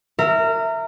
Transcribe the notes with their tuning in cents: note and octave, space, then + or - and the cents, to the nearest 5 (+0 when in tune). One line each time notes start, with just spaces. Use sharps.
A#4 -25 E5 +0